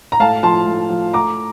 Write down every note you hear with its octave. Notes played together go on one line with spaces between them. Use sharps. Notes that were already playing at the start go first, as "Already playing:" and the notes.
A#5
A2 F5 A5
F3 A5 C6
A2
F3
A2 A#5 D6